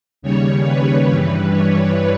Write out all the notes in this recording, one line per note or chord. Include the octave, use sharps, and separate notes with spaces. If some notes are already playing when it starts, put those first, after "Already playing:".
D#2 C#3 G3 C#5
B4
G2 E3 G3
C#5